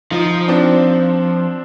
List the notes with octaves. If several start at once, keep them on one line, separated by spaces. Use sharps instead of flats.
F3 D#4 F4
C4 D4